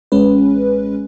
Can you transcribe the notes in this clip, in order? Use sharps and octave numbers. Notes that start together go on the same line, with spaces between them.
A1 G#3 C#4 B4